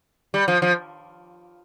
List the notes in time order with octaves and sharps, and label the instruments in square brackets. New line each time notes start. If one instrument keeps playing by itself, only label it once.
[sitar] G3
F3
F3